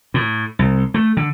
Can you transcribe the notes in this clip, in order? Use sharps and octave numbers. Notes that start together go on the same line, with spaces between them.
A2
C2
A3
D3